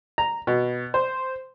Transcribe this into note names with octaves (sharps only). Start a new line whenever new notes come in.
A#5
B2
C5